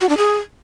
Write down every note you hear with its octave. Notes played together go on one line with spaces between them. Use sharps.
F#4
D4
G#4